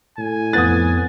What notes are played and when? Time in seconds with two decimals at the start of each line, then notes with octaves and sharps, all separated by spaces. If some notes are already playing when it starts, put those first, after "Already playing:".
0.18 A2 G#5
0.53 F2 B3 D#6 F#6 A6